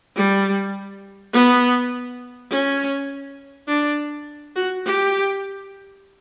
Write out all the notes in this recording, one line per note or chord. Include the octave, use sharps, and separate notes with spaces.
G3
B3
C#4
D4
F#4
G4